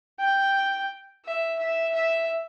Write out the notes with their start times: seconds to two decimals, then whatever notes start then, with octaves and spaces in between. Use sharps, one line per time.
0.19 G5
1.25 E5
1.59 E5
1.95 E5